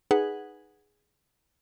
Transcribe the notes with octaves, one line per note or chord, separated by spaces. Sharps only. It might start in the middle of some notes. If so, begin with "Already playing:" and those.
D#4 G#4 B4 F#5